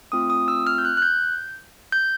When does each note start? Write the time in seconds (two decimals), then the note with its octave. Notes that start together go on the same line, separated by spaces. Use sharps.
0.12 A3 C4 F4 D#6
0.30 D#6
0.48 E6
0.67 F6
0.78 G6
0.85 F#6
0.97 F#6
1.02 G6
1.92 G6